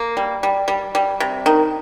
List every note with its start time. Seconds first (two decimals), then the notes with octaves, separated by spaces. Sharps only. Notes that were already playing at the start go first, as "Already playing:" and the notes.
Already playing: A#3
0.17 G3
0.43 G3
0.68 G3
0.95 G3
1.20 C3
1.46 D#3